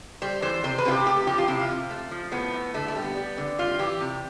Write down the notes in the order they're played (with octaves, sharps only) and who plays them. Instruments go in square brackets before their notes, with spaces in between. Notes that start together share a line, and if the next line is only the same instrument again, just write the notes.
[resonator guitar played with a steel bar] G3 C5
E3 C5
C3 C5
B4
C3 F4
G4
A3 G4
F3 G4
F4
C3 E4
F4
C3
A3
F3
A2 B3
A2
D3 A3
A3
G3
B3
G3
D3
G3 F4
E3 G4
C3